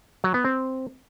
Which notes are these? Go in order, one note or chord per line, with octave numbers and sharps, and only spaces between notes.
F#3
B3
C4